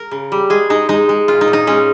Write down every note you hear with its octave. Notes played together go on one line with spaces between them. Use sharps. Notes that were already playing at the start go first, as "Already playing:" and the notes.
Already playing: A#4
C#3
G3
G#3 G#4
G#3 D#4
G#3 D#4
G#3
A#2 F4
D#4
A#2
D#4
G#3 C#4